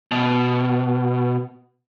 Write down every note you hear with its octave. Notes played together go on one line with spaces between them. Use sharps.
B2